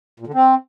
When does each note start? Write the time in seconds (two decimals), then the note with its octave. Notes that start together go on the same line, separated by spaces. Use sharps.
0.20 A#2
0.27 D3
0.34 C4